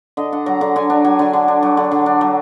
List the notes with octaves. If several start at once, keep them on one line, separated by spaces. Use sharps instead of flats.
D3 D#5
D4 F#5
F#3 A#5
D3 A#5
D3 G#5
D4 A#5
F#3 G#5
D3 G#5
D3
D4
F#3
D3
D3
D4
F#3